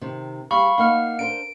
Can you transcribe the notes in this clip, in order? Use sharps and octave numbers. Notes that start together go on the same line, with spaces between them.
C3 D#3
G3 G4 G#4 F5 B5 C#6
A#3 D#4 F5 F#5 F6
D4 A#4 C5 D7